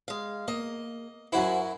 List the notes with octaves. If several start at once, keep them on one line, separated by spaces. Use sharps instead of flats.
G#3 F5
A#3 D#5
F#2 F#3 E4 C5 F#5 G#5